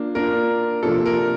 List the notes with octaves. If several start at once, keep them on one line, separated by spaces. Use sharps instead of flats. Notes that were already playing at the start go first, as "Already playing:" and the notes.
Already playing: A#3 D4 F4
A#3 D4 F4 A#4
C3 F3 A#3 D4 F4 A4
A#4